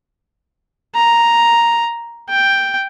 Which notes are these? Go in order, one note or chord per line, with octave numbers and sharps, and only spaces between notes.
A#5
G5